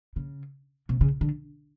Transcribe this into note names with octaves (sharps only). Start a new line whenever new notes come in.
C#3
C3
C#3
D3